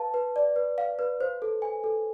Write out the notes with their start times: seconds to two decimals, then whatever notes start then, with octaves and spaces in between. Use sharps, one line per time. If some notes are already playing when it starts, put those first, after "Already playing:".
Already playing: B4 F5 A5
0.14 B4
0.36 D5
0.56 B4
0.78 F5
0.99 B4
1.21 C5
1.42 A4
1.62 G#5
1.84 A4